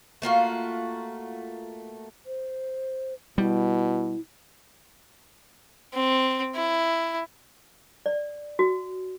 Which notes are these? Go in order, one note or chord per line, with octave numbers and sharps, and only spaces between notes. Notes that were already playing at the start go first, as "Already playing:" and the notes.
A3 A#3 F4 F#4
C5
B2 G3 E4
C4
E4
D5
F#4